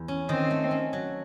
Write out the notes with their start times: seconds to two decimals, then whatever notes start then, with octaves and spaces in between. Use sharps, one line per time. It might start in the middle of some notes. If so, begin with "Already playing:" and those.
Already playing: E2
0.08 C#4
0.29 D#3 C4
0.50 A3
0.71 C#4
0.93 F#3